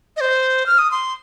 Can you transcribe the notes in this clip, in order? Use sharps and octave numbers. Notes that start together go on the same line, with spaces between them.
D#5
C5
F6
D#6
C6